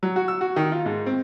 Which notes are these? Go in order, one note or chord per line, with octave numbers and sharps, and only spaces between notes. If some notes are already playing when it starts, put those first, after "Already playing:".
F#3
F#4
E6
F#4
D#3
F4
G#2
C4